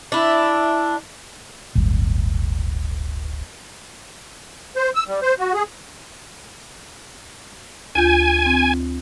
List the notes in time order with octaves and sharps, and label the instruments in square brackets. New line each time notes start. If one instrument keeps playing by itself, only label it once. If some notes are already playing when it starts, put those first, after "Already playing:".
[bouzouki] D4 E4
[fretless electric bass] D1 G1
[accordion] C5
E6
G3
C5
F#4
G#4
[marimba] D2 F4 G6 [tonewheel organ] G#5
[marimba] C4